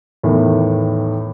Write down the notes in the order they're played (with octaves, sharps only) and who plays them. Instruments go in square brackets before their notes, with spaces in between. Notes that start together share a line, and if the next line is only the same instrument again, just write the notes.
[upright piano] E2 A2 D#3